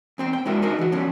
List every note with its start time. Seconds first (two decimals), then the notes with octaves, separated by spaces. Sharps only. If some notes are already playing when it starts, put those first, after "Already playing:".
0.18 E2 C4 G5
0.33 G5
0.46 G#3 D4 E4 F#4 A#4 E5
0.62 D4 D#4 F#4 G#4 A#4 D#5
0.79 E3 F#4
0.92 D3 F3 G3 C#4